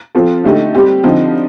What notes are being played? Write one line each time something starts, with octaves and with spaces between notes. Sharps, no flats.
F3 C4 F4 A4
D3 A3 D#4 G4
G3 C4 G4
D3 F3 C4 D#4